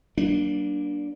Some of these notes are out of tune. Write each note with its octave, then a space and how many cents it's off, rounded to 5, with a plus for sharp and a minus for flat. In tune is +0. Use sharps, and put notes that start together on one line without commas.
G3 -25 A#3 +25 D4 +0